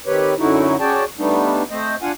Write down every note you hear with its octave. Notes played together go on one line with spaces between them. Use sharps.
D#3 C4 G4 B4 C#5
F#2 D3 F#3 D#4 E4 F#4
C#4 F#4 G#4 D5 G5 A5
G3 A3 B3 D4 D#4
A3 C4 C5 D#5
D4 F4 F5 F#5 G#5